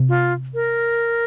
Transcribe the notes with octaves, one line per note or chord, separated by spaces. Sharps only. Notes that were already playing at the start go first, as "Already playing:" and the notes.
Already playing: C3
F4
A#4